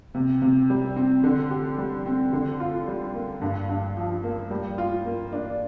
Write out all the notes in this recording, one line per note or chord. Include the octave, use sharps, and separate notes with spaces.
C3
C3
G3
C4
D3
G4
G3
C4
D3
F4
G3
A#3
G2
G2
F3
A#3
G3
F4
A#3
D4